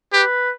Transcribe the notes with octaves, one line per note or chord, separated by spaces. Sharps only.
G4 B4